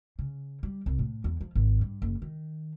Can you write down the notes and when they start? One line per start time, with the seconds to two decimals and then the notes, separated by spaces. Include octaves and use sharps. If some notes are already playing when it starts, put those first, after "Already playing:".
0.19 C#3
0.63 G3
0.86 C2
0.99 A2
1.24 E2
1.41 F3
1.55 G#1
1.81 G2
2.02 F#1
2.22 D#3